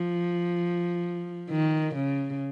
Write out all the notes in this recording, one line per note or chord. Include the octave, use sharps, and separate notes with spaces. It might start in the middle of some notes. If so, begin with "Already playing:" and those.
Already playing: F3
D#3
C#3